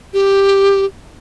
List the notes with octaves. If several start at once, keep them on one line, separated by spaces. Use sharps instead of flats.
G4